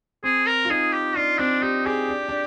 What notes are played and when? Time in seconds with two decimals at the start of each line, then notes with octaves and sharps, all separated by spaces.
0.24 C4 G#4
0.46 A#4
0.65 F4
0.70 D#4 G#4
0.93 G4
1.15 D4 F4
1.39 C4 D4
1.62 D#4 G4
1.86 G4 G#4
2.09 D4
2.29 D4